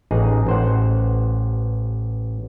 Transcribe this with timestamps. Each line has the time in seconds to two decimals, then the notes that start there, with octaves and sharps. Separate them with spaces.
0.11 A1 D#4 G#4
0.47 A1 C5 F#5